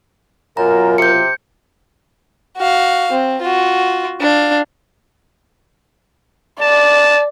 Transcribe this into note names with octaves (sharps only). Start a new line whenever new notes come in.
F#2 B2 F#3 F4 A#4 A#5
C3 G6 C#7
F#4 F5
C4
F4 F#4
D4 F5
D5 A5